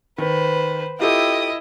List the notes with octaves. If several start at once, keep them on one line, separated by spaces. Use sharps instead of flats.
D#3 B4 C5
E4 F4 G4 A4 D#5 G5 D#6